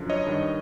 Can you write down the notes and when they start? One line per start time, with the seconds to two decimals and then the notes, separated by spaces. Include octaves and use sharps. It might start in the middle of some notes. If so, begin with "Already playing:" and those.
Already playing: F#2 D3 F3
0.10 C#5 D#5
0.26 G2 D#3